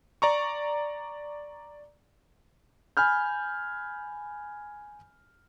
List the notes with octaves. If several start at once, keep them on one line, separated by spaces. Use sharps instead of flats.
D5 A#5 C#6
G#5 B5 F6 G6